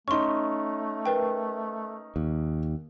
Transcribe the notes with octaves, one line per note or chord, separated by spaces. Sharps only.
A3 C#4 D#4 C6 C#6
A#4 B4 G5
D#2